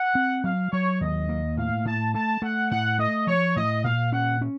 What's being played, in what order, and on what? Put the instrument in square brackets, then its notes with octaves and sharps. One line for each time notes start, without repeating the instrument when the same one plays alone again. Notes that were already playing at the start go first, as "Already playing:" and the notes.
Already playing: [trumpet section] F#5
[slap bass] C4
[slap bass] F#3 [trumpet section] F5
[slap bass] F#3 [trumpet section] C#5
[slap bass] D#2 [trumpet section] D#5
[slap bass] A#3
[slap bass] A2 [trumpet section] F5
[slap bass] A2 [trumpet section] A5
[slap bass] A3 [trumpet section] A5
[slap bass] A3 [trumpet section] F#5
[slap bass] A2 [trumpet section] F#5
[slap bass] A3 [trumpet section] D#5
[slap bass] F3 [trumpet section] C#5
[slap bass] A2 [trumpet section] D#5
[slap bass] A#2 [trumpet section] F5
[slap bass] C#4 [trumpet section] F#5
[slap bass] C#4